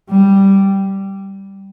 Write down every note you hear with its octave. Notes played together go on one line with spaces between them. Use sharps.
G3